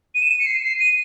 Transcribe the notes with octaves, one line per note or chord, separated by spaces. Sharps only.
D#7
E7
D#7
C#7
C7
C7
D#7